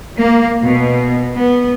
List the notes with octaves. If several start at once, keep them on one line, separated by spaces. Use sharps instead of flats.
A#3
B2
B3